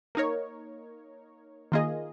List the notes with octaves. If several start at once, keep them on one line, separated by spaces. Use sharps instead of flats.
A#3 D#4 A#4 C#5
D#3 A#3 F4 G#4 D#5